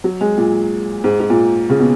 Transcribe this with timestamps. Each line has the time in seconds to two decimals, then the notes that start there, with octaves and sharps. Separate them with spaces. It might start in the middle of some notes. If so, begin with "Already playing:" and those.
0.04 F#3
0.21 G#3
0.37 A#2
1.04 G#2
1.20 G#2
1.30 A#2
1.70 C#3
1.79 B2